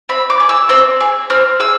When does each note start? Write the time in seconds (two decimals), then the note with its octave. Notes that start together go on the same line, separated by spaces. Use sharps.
0.09 C4 B5
0.30 D6
0.40 G#4
0.49 E6
0.69 C4 E6
1.00 G#4
1.30 C4 F6
1.60 G#4 E6